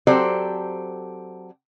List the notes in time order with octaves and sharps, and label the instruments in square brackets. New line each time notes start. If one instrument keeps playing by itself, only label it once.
[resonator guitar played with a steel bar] F#3 C4 G4 A4 C5 D5